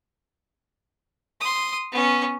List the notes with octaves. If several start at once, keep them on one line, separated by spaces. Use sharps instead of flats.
C6 D#6
B3 C#4